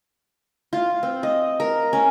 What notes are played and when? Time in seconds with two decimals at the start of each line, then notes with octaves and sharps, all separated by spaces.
0.73 F4
1.03 C4
1.23 D#5
1.60 A#4
1.93 C#4